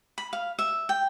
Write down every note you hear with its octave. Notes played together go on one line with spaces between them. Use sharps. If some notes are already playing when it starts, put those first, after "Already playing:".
B5
F5
E5
G5